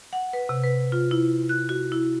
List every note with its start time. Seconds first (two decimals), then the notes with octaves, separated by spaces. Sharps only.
0.13 F#5
0.33 B4
0.49 C3
0.63 B4
0.92 F4
1.11 E4
1.49 F#6
1.69 F#4
1.92 E4